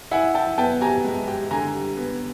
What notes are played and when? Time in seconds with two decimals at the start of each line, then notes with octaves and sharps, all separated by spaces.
0.11 E4 F#5 G#5
0.35 E4 G5 A5
0.58 B3 G5 A5
0.81 G4 G#5 A#5
1.05 G#3
1.28 G4
1.51 D3 G#5 A#5
1.74 G3
1.97 B3